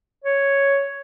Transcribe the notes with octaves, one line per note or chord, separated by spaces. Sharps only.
C#5